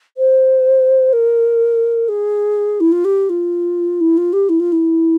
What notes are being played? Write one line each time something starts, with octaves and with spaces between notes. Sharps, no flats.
C5
A#4
G#4
E4
F4
G4
F4
E4
F4
G4
E4
F4
E4